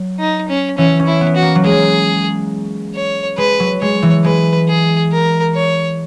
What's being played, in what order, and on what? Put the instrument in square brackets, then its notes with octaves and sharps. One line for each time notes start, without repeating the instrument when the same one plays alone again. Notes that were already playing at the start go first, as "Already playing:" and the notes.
Already playing: [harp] F#3
[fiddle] D#4
C#4
[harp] E3 [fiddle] C#4
[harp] C#4
[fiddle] E4
[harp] B3
[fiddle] F#4
[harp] A#3
F#3
[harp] G#3 [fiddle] G#4
[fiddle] C#5
[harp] G#3 [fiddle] B4
[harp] F#3
[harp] G#3 [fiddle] C#5
[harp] E3
[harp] G#3 [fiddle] B4
[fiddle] G#4
A#4
C#5